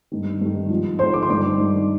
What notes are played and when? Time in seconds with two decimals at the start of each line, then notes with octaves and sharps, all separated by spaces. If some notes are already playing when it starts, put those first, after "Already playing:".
0.12 G2 D#3
0.41 G2 D#3
0.70 G#2 F3
0.99 G#2 F3 C5 C6
1.14 D6
1.22 C6
1.29 G2 D#3 D5 D6
1.58 G2 D#3